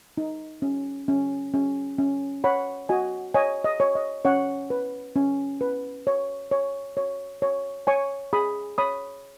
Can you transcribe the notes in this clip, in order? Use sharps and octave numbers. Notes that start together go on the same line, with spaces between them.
D#4
C#4
C#4
C#4
C#4
C#5 F#5 B5
F#4 D#5 G#5
C#5 D#5 G#5
D#5
C#5
D#5
C#4 C#5 F#5
B4
C#4
B4
C#5
C#5
C#5
C#5
C#5 G#5 C#6
G#4 B5 D#6
C#5 B5 D#6